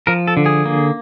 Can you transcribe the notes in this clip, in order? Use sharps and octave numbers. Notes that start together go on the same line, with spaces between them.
F3 A#4
A4
D3
G#4
A#3